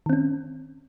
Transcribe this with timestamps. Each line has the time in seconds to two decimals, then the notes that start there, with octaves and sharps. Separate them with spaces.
0.06 D#3
0.10 C4
0.13 C#4